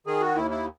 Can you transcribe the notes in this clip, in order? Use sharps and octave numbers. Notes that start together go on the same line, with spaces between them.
D#3 G#4
F#4
D#2 E4
E4